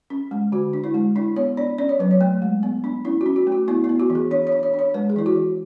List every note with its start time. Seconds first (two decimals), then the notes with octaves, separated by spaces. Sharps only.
0.10 C#4
0.31 G#3
0.52 D3 F#4
0.73 D4
0.84 E4
0.94 G#3
1.16 D4 E4
1.36 B3 C#5
1.57 D4 D5
1.78 C#4 D5
1.89 C#5
1.99 F#3 B4
2.11 C#5
2.21 A3
2.42 G#3
2.63 B3
2.84 D4
3.05 C#4 E4
3.21 F#4
3.26 C#4
3.36 F#4
3.47 A3
3.52 F#4
3.68 B3 E4
3.84 E4
3.89 B3
4.00 F#4
4.10 E3
4.15 G#4
4.31 D4 C#5
4.47 C#5
4.52 D4
4.63 C#5
4.74 D4
4.79 C#5
4.94 G#3 B4
5.10 G#4
5.16 E3 E4
5.26 F#4
5.36 E3